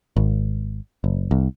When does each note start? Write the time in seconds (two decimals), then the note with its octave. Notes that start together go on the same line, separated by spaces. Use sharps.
0.17 G#1
1.04 F#1
1.31 C2